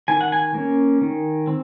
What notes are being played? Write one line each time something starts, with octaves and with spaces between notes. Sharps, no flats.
D#3 G#5
F#5
G#5
A#3 C#4
D#3
C4